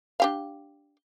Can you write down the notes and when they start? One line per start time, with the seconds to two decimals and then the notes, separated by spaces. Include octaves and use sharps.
0.20 D4 G4 F5